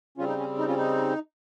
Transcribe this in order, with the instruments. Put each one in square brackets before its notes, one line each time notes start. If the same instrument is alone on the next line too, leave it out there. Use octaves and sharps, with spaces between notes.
[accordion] C#3 G3 C4 C#4 F4
D#4
C#4
D#4
C#4 F4
D#4